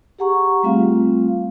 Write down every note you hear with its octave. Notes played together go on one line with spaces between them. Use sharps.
G4 G#4 F#5 A#5 C#6
G3 A3 C4 F4 F5